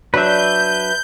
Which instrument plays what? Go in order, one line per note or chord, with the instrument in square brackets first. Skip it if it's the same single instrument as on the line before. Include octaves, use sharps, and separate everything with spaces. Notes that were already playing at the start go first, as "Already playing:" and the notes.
[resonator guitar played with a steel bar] F#3 D4 [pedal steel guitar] B4 E5 [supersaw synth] G6